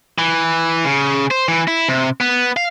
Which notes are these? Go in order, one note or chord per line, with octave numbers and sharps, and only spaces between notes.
E3
C#3
C5
E3
E4
C3
B3
F5